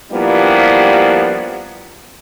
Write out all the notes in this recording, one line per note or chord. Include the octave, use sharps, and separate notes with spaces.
G2 F3 G3 A#3 B3 E4